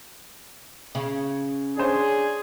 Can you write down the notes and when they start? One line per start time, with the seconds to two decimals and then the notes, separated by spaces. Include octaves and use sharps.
0.95 C#3
1.77 D4 G#4 C5 C#5